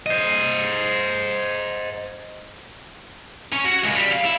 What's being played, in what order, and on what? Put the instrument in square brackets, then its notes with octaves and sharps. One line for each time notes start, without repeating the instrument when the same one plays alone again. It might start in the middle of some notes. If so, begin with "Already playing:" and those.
[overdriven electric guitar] C5 D#5
[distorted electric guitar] C#4
F#4
C#2
G3
F5
E4